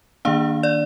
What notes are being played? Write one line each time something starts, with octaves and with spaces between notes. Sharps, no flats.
D#3 A#3 D4 F5
D5